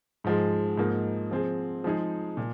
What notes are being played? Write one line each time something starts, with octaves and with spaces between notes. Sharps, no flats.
G#2 F3 G#3
G#2 F3 A#3 D#4
F3 C4 G#4
F3 G#3 D#4 G#4
A#2